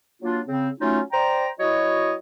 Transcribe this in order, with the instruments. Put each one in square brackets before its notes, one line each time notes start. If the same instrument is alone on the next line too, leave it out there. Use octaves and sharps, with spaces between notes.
[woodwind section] F#3 A#3 D4 F4
C#3 C4
F#3 A3 C#4 D#4 F4
C5 D5 G5 A#5
F#3 E4 F#4 C#5 D#5